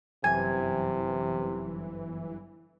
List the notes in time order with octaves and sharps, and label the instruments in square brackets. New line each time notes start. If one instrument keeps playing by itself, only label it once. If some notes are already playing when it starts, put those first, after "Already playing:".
[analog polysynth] G1 E3 [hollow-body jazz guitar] F#2 [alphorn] C3 [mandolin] G#5